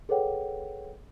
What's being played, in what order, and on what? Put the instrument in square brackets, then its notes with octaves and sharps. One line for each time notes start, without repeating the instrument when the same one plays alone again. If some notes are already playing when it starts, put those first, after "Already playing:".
[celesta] G#4 A4 B4 C#5 F#5 G5